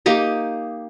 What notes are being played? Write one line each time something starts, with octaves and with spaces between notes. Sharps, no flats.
A#3 D#4 G4 D#5